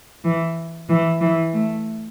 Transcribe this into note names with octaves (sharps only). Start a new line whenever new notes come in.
E3
E3
E3
A3